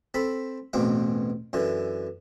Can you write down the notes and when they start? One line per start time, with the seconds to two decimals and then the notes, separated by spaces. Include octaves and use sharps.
0.14 C4 A4 B5
0.73 A1 E2 B2 C4 D6
1.53 F#2 D3 E3